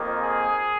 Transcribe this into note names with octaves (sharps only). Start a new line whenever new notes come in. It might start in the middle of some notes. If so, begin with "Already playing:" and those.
Already playing: F2 D#3 A#3
G#4